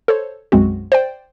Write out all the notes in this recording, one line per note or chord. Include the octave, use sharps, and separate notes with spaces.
A4 C5 C#5
B1 F#2 G#3 C4 F#4
C5 D5 G5